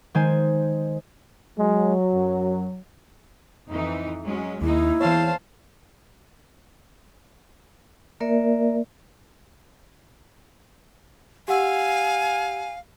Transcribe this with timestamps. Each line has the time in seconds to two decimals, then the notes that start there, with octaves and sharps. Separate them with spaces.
0.15 D#3 G#3 C5 G#5
1.59 F#3 G#3
2.13 F#2
3.69 F2 E3 D#4
4.24 F#3 G#3 C#4
4.61 D#2 G#3 A#3 D#4 E4
5.01 E2 E3 C5 C#5 F5 A5
8.20 A#3 A#4 D5 E5
11.48 G4 F5 F#5 G#5 E6